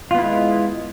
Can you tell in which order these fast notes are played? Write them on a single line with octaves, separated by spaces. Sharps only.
F4 B3 E4 G#3